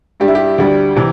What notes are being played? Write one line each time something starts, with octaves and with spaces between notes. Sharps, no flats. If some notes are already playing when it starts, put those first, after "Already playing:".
G2 G3 G4
E4
G4
D2 D3 G3
C3 E3